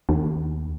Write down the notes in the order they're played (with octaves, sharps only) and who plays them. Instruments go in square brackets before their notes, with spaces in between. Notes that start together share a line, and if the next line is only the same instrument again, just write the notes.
[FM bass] D#2